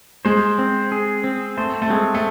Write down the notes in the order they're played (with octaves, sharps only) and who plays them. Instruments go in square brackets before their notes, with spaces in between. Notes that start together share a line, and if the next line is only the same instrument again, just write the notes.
[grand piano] G#3 [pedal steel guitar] C5
[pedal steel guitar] C4
G#4
C4
[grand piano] A3 [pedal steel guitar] C5
[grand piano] A3
[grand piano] G#3 [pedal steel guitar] C4
[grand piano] A3